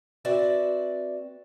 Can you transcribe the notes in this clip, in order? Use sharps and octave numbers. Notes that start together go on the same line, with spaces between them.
C4 F#4 B4 D5 E5